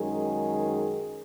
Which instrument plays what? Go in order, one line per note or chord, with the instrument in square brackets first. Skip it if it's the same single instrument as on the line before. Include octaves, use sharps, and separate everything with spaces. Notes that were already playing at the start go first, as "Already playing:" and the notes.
Already playing: [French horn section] F#2 D#3 G#3 G#4